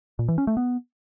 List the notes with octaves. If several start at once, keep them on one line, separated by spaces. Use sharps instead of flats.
A#2
E3
C#4
A3
B3